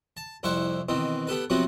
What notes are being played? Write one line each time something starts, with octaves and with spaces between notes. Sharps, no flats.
A5
C2 F2 E4 C5 F#5 C#6
B2 D#3 E3 C4
B3 G4 A4 B4
C3 F3 F#3 B3 C4 F#4